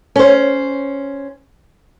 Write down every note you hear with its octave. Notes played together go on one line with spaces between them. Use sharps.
C#4 C5